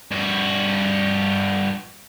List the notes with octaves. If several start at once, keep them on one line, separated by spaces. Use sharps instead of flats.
G2 F#4